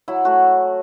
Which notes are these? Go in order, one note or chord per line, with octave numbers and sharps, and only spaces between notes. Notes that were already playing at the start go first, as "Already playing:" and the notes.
F#3 E4
A3 F#4